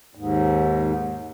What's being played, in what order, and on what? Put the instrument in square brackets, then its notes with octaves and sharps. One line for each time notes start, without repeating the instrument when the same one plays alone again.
[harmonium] D#2 G#2